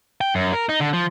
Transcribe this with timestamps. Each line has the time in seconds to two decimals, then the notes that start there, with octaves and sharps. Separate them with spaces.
0.21 G5
0.35 F#2
0.53 A#4
0.69 D#4
0.80 D3
0.93 F3